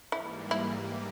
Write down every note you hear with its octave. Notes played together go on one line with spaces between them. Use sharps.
G#2 E3 G3 A#3 E4
E4